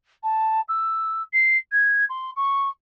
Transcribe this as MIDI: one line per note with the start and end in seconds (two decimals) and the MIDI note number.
0.23 0.61 81
0.68 1.22 88
1.33 1.57 96
1.72 2.05 92
2.09 2.31 84
2.36 2.69 85